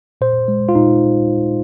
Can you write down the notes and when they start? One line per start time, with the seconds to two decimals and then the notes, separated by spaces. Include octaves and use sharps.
0.21 A#2 C5
0.48 G#3
0.69 F4
0.75 A#2 D#4